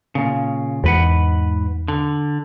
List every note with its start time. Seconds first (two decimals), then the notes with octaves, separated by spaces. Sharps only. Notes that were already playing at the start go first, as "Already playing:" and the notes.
0.15 A#2 C#3
0.84 E2 G#2 B4 F#5
1.88 D3